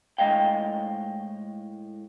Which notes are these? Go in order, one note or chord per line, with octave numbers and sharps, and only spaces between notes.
A2 G#3 D#5 F5 G5